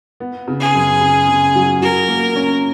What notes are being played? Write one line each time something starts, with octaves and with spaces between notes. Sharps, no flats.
B3
C#3
G#4
F#2
C#3
C#3
F#3
F#3 A#4
A#3
C#4